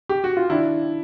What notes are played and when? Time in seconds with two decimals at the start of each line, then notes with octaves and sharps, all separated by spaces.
0.09 G4
0.24 F#4
0.37 F4
0.50 D#3 D4 E4